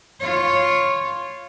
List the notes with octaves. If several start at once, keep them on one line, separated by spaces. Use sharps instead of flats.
F4 C#5